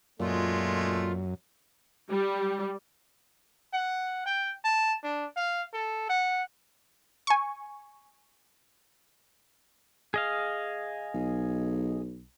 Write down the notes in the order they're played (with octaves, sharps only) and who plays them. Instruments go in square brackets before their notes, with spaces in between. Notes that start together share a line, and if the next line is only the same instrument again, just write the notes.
[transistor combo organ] F#2 [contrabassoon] A#2 [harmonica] G#3 A3 [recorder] F4
[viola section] G3
[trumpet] F#5
G5
A5
D4
F5
A4
F#5
[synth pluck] G#5 C#6
[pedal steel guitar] G#4 D#5 F5
[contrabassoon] B1